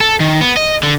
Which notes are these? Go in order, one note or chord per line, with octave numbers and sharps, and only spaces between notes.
A4
D#3
B3
D#5
D3